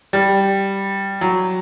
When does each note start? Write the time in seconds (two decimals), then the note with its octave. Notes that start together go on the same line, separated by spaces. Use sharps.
0.13 G3
1.21 F#3